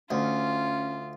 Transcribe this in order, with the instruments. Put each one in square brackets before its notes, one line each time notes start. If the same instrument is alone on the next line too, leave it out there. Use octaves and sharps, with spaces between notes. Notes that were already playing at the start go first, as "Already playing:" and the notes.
[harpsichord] D2 [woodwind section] C#4 [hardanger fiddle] F4